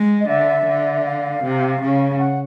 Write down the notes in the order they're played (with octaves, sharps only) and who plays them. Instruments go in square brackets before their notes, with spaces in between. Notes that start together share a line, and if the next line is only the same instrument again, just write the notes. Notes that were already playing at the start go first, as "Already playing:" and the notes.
Already playing: [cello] G#3
[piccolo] D#5
[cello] D3 [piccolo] E5
[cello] D3
[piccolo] E5
F5
[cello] C3
C#3
[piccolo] F#5